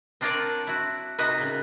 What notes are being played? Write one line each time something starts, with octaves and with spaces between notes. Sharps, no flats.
C4 D4 F4 A#4 C#5 D5
E4 F#4
C3 D#4 F#4 B4
A#2 C#3